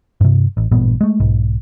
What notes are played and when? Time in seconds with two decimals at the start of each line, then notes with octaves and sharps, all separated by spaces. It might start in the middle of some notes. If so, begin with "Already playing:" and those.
0.21 G2 C3
0.57 A1
0.71 A1 G2 A#2 B3
1.01 G#3 A3
1.20 B1 G#2